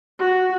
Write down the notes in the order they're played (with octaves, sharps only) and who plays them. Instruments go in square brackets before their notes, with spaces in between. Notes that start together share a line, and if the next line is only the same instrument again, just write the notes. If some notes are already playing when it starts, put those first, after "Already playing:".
[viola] F#4